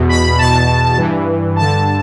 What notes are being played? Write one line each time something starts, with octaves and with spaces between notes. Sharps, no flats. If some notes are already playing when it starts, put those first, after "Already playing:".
Already playing: E2 B2
B5
E2 B2 A5
G2 E3
G2 D3 A5